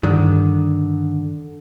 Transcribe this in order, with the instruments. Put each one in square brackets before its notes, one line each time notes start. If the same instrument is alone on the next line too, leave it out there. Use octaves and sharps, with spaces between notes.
[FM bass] G2 [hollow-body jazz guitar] D3 D#3